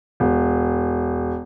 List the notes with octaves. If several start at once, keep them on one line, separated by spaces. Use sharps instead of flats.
E1